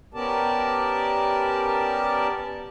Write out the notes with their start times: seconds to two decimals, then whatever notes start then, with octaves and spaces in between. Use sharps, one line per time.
0.14 B3 C#4 G4 A#4 D5 A5